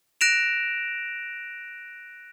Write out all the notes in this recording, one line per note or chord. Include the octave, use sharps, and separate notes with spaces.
F#6 A#6 D7 E7 F7